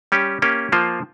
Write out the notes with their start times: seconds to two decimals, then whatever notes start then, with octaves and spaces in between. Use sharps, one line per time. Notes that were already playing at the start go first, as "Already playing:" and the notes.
0.12 G3 C#4 G4
0.42 A#3 C#4 G4
0.72 F3 A#3 F4 C5